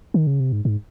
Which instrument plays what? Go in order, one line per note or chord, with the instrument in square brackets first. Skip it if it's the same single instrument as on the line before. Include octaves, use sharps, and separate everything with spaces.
[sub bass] D#3
C#3
C3
G#2
G#2